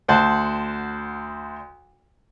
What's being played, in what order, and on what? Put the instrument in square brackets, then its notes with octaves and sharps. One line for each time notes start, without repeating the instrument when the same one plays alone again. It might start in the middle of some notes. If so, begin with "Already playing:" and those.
[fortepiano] D2 C5 F#5 A5